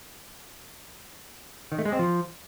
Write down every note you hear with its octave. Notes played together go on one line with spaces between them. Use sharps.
D#3
A3
G#3
C4
F3